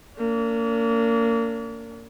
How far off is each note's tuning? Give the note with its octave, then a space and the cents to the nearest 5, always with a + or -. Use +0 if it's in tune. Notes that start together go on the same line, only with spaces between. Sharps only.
A#3 -25 D4 -45